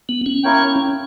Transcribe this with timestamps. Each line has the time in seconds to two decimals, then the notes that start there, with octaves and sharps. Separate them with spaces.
0.09 B3
0.26 C#4
0.43 A#3 E4 A#4 C#5 G5